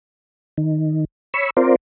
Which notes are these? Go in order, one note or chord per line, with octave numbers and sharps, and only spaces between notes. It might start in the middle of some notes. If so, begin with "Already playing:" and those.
D#3
C#5 B5 C#6 E6
C4 F4 A#4 C5 D5